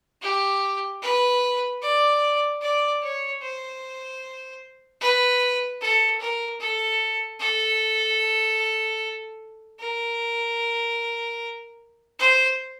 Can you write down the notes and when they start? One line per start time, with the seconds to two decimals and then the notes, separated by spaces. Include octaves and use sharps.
0.22 G4
1.02 B4
1.82 D5
2.61 D5
3.02 C#5
3.42 C5
5.01 B4
5.81 A4
6.20 A#4
6.60 A4
7.40 A4
9.80 A#4
12.19 C5